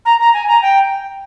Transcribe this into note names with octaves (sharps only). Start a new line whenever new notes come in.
A#5
A#5
G#5
A#5
G5